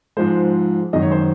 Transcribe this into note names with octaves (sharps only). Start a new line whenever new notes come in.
G#2 F3 G#3 C5
F#2 D#3 G#3 D#5
C#5
C5